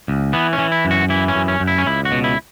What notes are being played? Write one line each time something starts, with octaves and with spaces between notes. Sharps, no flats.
C#2
E3 B3
C#4
E3
E4
F#2
F#4
E3 E4
C#4
F#2
C#4
F#2
E4
C#4
C#2 E4
F#4
B2
E4